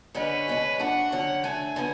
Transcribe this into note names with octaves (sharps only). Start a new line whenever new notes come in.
D3 G#3 C#4 F#4 B4
B2 G#3 C#4
A3 D4 F#4 F#5
D3 F#3 C#4
A3 D4 A4 G#5
D3 F#3 B3